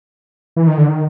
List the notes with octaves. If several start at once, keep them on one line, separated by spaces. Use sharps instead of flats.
E3
D#3
D3
D#3